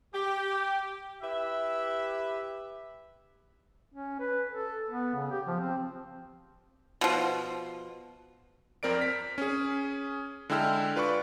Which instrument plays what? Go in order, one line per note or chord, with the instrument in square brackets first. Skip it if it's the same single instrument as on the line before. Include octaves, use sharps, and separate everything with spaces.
[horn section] G4
E4 G4 B4 E5
[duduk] C#4
B4
A4
B3
C#3
G4
F3
C4
[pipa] B2 F3
[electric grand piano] F2 C4 A#4 D5 D7
F6 B6
C#4 G#4
D3 G#3 E4 G5 E6 F6
F4 B4 D5 B5 C#6